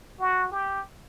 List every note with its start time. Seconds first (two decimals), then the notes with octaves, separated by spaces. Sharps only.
0.19 F#4
0.51 G4